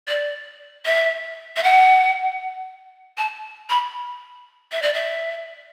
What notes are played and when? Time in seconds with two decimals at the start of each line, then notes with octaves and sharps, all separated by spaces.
0.08 D5
0.86 E5
1.56 E5
1.63 F#5
3.18 A5
3.70 B5
4.72 E5
4.82 D5
4.94 E5